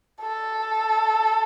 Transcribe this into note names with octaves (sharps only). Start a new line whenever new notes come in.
A4